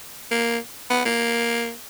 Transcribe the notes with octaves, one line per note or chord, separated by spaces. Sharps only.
A#3
B3
A#3